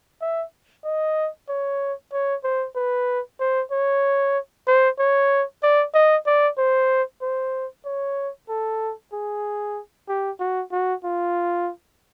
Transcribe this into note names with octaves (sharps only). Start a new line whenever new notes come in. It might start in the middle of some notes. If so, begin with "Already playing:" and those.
E5
D#5
C#5
C#5
C5
B4
C5
C#5
C5
C#5
D5
D#5
D5
C5
C5
C#5
A4
G#4
G4
F#4
F#4
F4